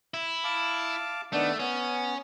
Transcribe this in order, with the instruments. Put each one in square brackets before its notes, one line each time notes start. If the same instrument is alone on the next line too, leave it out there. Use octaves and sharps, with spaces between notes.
[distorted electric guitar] E4
[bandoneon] F5 A5 D6
[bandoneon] D#3 B3 D4 [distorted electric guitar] A3
[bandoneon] B3 [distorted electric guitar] C#4